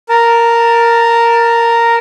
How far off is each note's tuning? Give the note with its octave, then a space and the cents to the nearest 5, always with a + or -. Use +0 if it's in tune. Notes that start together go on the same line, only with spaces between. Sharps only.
A#4 +0 A5 +15